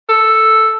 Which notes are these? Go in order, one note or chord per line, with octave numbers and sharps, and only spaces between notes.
A4